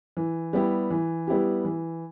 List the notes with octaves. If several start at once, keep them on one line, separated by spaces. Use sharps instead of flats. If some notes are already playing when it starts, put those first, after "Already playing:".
E3
G3 B3 E4 G4
E3
G3 B3 E4 G4
E3